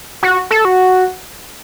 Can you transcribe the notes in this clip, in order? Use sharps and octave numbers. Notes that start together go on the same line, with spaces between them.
F#4
A4
F#4